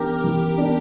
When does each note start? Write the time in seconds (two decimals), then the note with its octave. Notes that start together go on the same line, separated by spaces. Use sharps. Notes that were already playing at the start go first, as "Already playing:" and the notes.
Already playing: E3 B3 D4 G4 A#4
0.24 E3 A#4
0.58 B3 D4